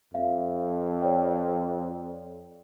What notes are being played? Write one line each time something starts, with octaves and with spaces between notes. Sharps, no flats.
F2 E5 F5
C#5 D5 G5